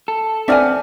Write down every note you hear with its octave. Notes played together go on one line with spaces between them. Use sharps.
A4
C4 D5 E5 F#5 G#5 F6